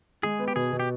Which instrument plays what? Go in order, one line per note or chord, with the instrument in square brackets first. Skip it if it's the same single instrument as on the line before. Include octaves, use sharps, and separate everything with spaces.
[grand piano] G#3 [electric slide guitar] G#4
[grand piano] B3
[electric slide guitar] G4
[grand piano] B2 [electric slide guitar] G#4
[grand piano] B2
[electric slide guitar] G4